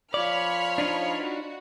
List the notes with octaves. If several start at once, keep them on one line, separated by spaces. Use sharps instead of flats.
F3 C#5 D5 B5 F6
D4 D#4 F4
F#4